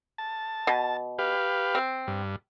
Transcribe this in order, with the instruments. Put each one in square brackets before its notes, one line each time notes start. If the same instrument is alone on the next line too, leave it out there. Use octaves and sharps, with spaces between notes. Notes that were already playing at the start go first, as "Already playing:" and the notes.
[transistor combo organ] A5
[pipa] B2
[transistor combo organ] G4 B4 F5
[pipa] C4
[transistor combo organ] G2